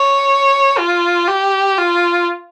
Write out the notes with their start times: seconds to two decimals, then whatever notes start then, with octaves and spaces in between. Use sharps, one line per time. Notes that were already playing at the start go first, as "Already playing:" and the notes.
Already playing: C#5
0.78 F4
1.28 G4
1.78 F4